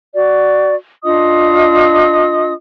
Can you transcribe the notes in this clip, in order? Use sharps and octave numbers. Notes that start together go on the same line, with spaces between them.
F#4 D5
D4 F4 D#5 D#6